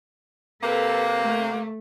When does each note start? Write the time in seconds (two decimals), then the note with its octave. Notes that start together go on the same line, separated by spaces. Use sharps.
0.62 C3 A#3 A4 B4
1.22 A3